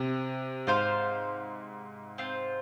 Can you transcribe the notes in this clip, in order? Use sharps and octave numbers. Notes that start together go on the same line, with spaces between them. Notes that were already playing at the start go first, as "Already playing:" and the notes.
Already playing: C3 C4
G#2 F4 C5 F5
C4 F4 C5